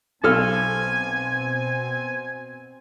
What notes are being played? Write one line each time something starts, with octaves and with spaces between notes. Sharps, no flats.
B1 B2 C4 A4 G#5 F6